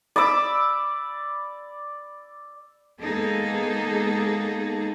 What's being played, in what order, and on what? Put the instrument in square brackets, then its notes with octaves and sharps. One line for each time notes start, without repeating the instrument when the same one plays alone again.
[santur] D5 B5 D6 E6
[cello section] G#3 A#3 B3 D#4 G#4 A4